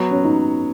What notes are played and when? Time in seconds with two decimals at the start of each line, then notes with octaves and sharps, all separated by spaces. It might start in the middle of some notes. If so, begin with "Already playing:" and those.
Already playing: F#3 B3 F#4
0.11 C#4
0.25 D#4